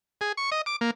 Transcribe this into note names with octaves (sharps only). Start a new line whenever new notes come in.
G#4
C#6
D#5
D6
A#3